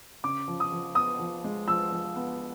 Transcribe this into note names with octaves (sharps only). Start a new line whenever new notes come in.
C#3 D6
F3
D#6
F3
B3 D#6
F3
G#3
F3 E6
F3
B3